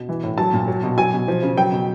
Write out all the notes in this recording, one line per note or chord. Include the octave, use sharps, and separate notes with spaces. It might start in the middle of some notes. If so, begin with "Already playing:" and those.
Already playing: B2
E3
A2
F#3 A5
A#2
F#3
B2
F#3 G#5
B2
F3
C#3
F#3 G5
B2